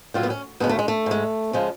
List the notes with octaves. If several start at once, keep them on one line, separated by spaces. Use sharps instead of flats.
A2 F#3 F4
B3
C#4
D2 C#3 G#3 B3
A3
G#3
A3
G#2 G#3
C#3 F3 G#3